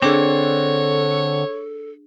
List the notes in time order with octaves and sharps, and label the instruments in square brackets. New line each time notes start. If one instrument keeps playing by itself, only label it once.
[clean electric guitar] D3 C4 [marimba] D4 G#4 [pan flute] A4 [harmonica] C#5